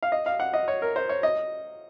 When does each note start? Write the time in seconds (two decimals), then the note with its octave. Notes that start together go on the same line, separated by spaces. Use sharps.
0.03 F5
0.12 D#5
0.26 F5
0.40 F#5
0.53 D#5
0.68 C#5
0.82 A#4
0.96 C5
1.09 C#5
1.23 D#5